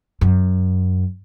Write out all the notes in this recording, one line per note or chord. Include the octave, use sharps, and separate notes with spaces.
F#2